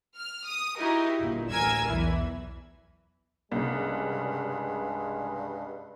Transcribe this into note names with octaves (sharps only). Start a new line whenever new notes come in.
F6
D#6
D#4 E4 F#4 G4 A#4
G1 A#2
A1 D2 A#4 G#5 E6 G#6
B1 E2 E3
C2 G2 C#3 G#3